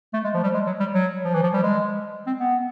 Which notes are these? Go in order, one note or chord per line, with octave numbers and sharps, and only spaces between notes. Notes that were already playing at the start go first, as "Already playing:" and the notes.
A3
G#3
F3
G3
G#3
F#3
G3
F#3
F3
E3
F3
G3
G#3
C4
B3